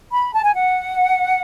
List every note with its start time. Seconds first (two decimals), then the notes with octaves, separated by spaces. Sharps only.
0.12 B5
0.33 A5
0.44 G#5
0.55 F#5